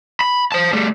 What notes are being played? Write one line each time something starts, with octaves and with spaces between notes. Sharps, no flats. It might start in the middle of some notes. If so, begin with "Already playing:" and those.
B5
C5 A5
G3 A3